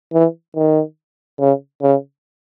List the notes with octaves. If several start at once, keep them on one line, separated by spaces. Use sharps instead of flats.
E3
D#3
C#3
C#3